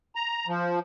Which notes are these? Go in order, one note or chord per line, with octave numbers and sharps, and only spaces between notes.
A#5
F3